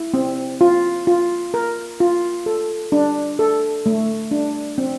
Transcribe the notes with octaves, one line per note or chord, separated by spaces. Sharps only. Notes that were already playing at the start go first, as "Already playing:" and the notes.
Already playing: E4
C4
F4
F4
A#4
F4
A4
D4
A4
A3
D4
C4